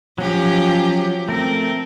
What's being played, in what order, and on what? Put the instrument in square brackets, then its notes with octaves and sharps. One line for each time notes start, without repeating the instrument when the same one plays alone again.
[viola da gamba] F3 G4 [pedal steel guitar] F#3 C#4
[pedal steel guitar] A3 A#4 [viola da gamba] C4